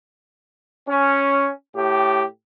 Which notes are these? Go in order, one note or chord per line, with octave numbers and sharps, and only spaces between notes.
C#4
A2 G4